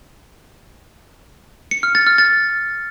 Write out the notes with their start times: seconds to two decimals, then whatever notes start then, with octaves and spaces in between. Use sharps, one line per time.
1.71 C#7
1.83 F6
1.95 A6
2.07 F6
2.18 A6